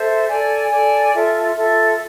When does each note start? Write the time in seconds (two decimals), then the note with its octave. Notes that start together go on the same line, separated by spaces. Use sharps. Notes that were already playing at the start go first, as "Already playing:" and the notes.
Already playing: A4 C5 E5
0.28 A4 D5 G#5
0.70 A4 D5 G#5
1.12 F4 A4 E5
1.55 F4 A4 E5